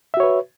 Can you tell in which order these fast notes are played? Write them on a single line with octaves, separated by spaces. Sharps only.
E5 F#4 C#5 B4